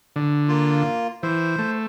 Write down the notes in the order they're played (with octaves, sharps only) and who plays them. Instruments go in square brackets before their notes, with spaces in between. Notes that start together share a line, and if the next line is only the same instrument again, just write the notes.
[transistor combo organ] D3
[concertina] A#3 F4
[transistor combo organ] E3 [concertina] C5
[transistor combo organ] A3